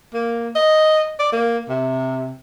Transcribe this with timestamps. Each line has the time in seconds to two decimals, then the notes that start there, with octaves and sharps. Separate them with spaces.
0.14 A#3
0.55 D#5
1.19 D5
1.32 A#3
1.69 C3